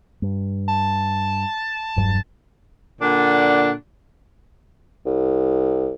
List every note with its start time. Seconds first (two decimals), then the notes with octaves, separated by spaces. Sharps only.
0.22 G2
0.68 A5
1.96 E1 G2 F#3
3.01 A#2 D3 D4 D5 F#5
5.06 C2